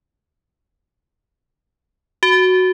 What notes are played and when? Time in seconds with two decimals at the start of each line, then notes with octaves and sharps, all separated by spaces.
2.23 F#4